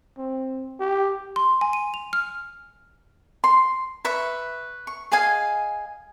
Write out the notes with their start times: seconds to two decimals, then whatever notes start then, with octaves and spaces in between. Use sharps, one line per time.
0.18 C4
0.80 G4
1.36 C6
1.61 G#5
1.73 D#7
1.94 F7
2.13 F6
3.44 C6
4.05 B4 E5 C#6
4.87 C#6
5.12 G#4 D#5 F5 G#5